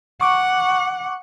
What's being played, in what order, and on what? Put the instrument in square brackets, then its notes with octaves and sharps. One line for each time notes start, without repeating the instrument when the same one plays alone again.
[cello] F#5 [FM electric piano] C#6 D6